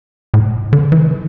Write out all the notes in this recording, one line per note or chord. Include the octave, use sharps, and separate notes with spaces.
A2
D3
E3